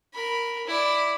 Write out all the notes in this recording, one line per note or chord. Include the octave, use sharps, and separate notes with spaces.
A#4 B5
E4 D5